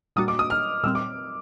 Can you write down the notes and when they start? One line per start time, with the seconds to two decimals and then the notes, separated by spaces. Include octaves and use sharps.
0.16 A#2 G3 A#3 D4 F#4 D#6
0.28 D6
0.39 D#6
0.50 F6
0.83 A#2 G3 C4 E6
0.95 D6